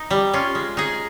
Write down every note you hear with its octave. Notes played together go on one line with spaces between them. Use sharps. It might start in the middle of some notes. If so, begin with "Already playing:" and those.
Already playing: D#4
G3
C#4 F4
G#3
D#4 G#4